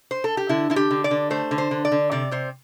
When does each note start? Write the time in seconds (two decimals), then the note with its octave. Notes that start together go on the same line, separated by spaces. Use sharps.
0.11 C5
0.24 A4
0.37 G4
0.49 D3 E4
0.70 D3 E4
0.76 G4
0.91 D3
1.04 D5
1.11 D3
1.30 A3 C5
1.51 D3
1.58 C5
1.71 D3
1.85 D5
1.92 D3
2.12 C3 D5
2.31 C3 C5